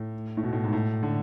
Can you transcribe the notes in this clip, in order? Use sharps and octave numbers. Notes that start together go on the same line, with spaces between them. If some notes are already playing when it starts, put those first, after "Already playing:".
Already playing: A2
A2
B2
A2
G#2
A2
D3